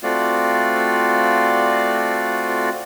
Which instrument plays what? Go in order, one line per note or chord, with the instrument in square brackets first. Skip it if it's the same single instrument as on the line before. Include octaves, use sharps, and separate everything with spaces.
[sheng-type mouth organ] A3 C4 F4 F#4 D5